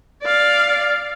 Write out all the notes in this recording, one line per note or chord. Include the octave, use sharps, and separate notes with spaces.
D5 F5